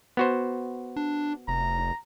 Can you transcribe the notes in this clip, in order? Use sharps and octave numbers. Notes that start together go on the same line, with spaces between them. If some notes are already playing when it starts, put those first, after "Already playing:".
B3 F#4 C5
D4
F1 A#5